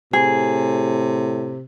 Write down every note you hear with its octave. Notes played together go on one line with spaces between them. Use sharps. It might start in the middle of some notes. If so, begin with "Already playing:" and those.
A2 C3 G#4